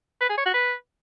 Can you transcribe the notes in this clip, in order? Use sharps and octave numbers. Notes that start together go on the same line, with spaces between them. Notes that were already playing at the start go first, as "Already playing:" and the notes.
B4
G#4
C#5
F#4
B4